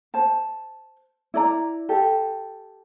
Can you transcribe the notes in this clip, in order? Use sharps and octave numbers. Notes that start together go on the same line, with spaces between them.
C5 A5
E4 D5 A#5
G4 A4